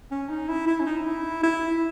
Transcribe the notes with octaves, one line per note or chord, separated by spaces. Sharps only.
C#4
D#4
E4
E4
C#4
D#4
E4
E4